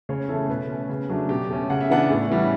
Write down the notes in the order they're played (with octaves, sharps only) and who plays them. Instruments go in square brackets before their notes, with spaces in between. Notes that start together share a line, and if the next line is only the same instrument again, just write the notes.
[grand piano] C#3 C#5
E3 A3 A4
B2 B4
A3 C#4
C#3
F#3 A3 D4
B2 G4
A3 C#4
C#3 F#5
E5
E3 B3 D4 F#5
A2
E3 G3 C#4